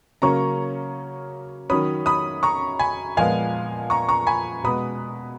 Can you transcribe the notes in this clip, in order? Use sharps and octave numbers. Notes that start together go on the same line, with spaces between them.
C#3 F#3 A#3 C#4 A#5 C#6
D#3 F#3 C#4 B5 D#6
B5 D#6
A#5 C#6
G#5 B5
A#2 F3 G#3 B3 F5 G#5
A#5 C#6
A#5 C#6
G#5 B5
B2 G#3 B3 B5 D#6